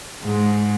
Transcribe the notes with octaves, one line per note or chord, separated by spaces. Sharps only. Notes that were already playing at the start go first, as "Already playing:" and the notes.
G#2